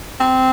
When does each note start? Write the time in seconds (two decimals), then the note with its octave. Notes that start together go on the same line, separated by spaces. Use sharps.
0.21 C4